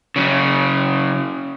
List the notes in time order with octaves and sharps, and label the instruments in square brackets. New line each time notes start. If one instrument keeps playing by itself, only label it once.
[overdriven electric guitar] C#3 F#3